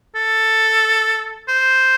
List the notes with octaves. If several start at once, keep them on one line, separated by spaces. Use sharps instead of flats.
A4
C5